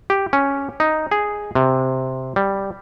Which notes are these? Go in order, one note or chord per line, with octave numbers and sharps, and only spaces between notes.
G4
C#4
D#4
G#4
C3
G3